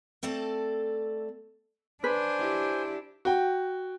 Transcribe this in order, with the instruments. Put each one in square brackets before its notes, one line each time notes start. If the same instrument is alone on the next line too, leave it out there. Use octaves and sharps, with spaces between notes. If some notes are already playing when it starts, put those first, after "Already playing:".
[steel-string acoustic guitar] A3 C4 A4 D5 A5
[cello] D4 [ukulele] B4 [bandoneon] C5 G#5
[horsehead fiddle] E4 G4
[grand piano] F#4 G5